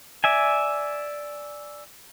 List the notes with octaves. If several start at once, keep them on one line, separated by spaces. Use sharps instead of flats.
D5 E5 G#5